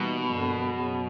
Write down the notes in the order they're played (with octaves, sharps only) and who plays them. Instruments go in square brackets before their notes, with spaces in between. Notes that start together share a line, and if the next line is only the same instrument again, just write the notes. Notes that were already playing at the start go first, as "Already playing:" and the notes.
Already playing: [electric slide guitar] B2 [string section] E3 G3 A#3 D#4
[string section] G2 D3 F3 A#3
F#2 C#3 F#3